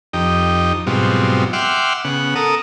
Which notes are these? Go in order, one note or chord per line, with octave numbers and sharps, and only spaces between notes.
F2 D#4 G4
G#2 B2 F#3 G3 C4 F4
E5 F#5 G5 C6 D6 F6
C#3 B3 F#5
A4 A#4 D#6